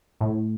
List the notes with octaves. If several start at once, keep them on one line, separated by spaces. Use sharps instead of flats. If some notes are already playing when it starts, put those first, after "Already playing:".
A2